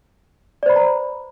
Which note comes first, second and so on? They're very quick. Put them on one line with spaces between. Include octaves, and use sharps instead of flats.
D5 C5 B5 B4 A#5